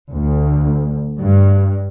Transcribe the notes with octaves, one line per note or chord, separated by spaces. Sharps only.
D2
G2